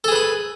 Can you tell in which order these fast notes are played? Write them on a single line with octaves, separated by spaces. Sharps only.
A4 G#4 B4 B5